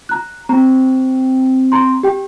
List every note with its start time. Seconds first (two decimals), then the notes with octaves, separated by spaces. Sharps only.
0.09 A#5 F#6
0.49 C4 A#5
1.72 A#5 C6
2.03 G4 G5